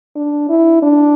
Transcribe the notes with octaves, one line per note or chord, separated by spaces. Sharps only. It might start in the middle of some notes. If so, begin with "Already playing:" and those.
D4
E4
D4